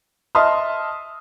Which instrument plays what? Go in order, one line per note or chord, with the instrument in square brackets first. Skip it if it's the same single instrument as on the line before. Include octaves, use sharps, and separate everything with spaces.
[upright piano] D#5 E5 A5 C6 D#6 F6